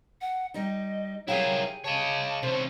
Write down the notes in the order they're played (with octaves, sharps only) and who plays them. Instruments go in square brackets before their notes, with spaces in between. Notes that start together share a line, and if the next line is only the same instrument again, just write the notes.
[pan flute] F#5
[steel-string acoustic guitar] G3 D#4 [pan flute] D#5
[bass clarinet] F#3 [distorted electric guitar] E4 A#4 [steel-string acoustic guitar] G4 G#4 [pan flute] F5
[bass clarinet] C#3 [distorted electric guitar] C#5 D#5 [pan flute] A5
[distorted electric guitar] C3 C#4 [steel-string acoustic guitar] C5